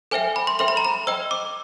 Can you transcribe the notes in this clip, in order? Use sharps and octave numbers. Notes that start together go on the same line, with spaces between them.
A4 C5 E5 G5 G#5
B5
C6
A4 C5 E5 G5 C6
B5
A#5
B5
C5 D#5 G5 E6
D6